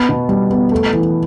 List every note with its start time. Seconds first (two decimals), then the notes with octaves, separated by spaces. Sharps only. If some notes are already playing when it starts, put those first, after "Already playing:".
Already playing: B3
0.09 B2
0.29 G3
0.51 B3
0.71 A3
0.93 E3